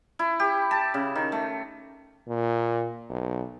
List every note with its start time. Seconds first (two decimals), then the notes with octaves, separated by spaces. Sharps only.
0.19 E4
0.40 G4
0.71 A5
0.94 C#3
1.15 D#3
1.32 A3
2.28 A#2
3.10 B1